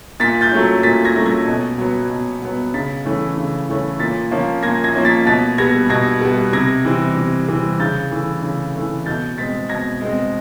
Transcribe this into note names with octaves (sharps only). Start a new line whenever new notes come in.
A#2 A6 B6
G6 A6
F#3 A3 C#4
A#2 A6 B6
G#6 A#6
F#3 A3 C#4
G#6 A#6
B2
F#3 B3
B2
F#3 B3
C#3 A6 B6
E3 A3 C#4
C#3
E3 A3 C#4
A#2 A6 B6
F3 A#3 C#4
A#2 G#6 A#6
G#6 A#6
F3 A#3 C#4
A6 B6
B2 A6 B6
G3 B3 G#6 A#6
B2 G#6 A#6
G3 B3
C3 G#6 A#6
E3 G3 C4
C3
E3 G3 C4
C#3 G6 A6
E3 A3
C#3
E3 A3
B2 G6 A6
G#3 C4 A6 B6
B2 G#6 A#6
G#3 C4